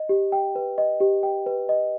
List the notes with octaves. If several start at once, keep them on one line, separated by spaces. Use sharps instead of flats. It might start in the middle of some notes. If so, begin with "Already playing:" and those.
Already playing: D#5
G4
G5
B4
D#5
G4
G5
B4
D#5